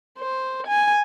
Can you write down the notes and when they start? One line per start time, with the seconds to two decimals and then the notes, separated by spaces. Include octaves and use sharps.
0.19 C5
0.67 G#5